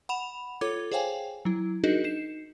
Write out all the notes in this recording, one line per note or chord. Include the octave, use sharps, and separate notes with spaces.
F#5 B5 E7 F7
F4 A4 C#5 D6 G#6
G#4 C5 C#5 F5 G5 G#5
F#3 E4
D4 D#4 F#4 G#4 A#4 D#5
D#4 C7 E7